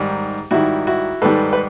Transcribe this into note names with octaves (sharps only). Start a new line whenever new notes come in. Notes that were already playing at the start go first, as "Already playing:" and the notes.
Already playing: G#2 D#3 G3
G#2 D#3 G3 E4 F#4
E4 F#4
G#2 D#3 G3 A4 B4
B4